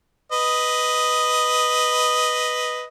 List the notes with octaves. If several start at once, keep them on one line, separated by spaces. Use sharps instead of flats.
B4 D#5